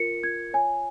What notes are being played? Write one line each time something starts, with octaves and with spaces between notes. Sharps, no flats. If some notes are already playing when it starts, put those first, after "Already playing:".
Already playing: F4 A#4 C#7
F4 G#6
C#5 G#5